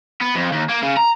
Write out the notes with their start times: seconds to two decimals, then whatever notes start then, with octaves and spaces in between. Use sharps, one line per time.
0.21 B3
0.35 F2
0.52 D#2
0.69 A#3
0.82 C#3
0.97 A#5